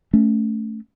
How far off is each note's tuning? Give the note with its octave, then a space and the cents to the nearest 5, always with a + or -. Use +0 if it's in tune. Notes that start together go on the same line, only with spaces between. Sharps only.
A3 +0 C#4 +15